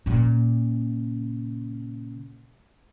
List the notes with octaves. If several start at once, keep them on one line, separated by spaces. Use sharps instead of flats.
A#2 C#3